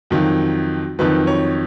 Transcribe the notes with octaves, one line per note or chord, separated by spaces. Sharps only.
F2 D#3 F#3
F2 D#3 F#3 B4
C#5